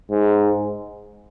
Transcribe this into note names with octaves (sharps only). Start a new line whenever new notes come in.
G#2